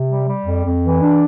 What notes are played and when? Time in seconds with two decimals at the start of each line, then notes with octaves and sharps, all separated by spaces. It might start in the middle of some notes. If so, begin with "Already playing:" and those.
Already playing: C3
0.09 G3
0.27 G3
0.46 F2
0.65 F2
0.83 E3
1.01 D4